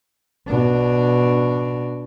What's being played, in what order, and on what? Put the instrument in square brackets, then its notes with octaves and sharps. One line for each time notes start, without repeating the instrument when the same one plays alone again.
[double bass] B2 D4